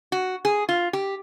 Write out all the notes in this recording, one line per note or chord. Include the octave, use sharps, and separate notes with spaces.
F#4
G#4
F4
G4